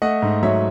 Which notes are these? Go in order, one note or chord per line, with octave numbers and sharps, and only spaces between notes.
A3 D#5 F#5
G#2
F#3 C#5 E5